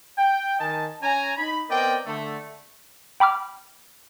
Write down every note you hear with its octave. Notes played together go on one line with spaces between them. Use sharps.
G5
D#3 D#5 G#5 A5
C#4 G#5 A#5
D#4 B5
B3 C4 A#4 D5 D#5 G5
D3 A3
G5 B5 D6 F6